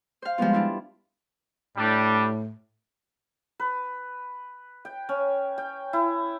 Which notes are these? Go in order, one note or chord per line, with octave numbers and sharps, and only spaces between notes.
C5 F5
F3 G3 G#3 B3 F4
D4 E4 F4
A2 G3 D4
B4
G5
C#4
G5
E4